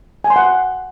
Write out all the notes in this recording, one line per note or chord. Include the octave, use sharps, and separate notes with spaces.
G#5
C6
F#5